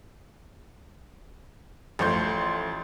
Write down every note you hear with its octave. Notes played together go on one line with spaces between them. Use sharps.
A1 F3 A3 C6 G6